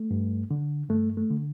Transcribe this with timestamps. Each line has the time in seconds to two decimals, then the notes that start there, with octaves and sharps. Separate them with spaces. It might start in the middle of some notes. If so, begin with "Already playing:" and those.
Already playing: A3
0.11 G2
0.51 D3
0.89 G2 A3
1.17 A3
1.30 D3